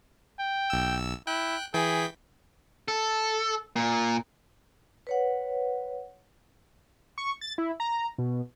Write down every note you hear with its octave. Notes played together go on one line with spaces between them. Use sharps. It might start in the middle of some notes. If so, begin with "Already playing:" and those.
G5
B1 E6
E4 G5 F#6
E3 G#4 G5 B6
A4
A#2
B4 C#5 F#5
C#6
A6
E4
A#5
B2